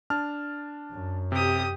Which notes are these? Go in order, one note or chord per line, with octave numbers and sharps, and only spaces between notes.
D4 A5 F6
F#2
C3 G4 D#6